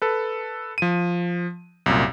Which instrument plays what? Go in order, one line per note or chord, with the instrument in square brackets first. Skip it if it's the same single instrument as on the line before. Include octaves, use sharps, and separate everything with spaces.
[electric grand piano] A4 B4
F3 D#7
C2 F#2 A#2